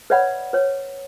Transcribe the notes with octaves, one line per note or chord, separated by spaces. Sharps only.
B4 C#5 D5 E5 F#5 B5
B4 C#5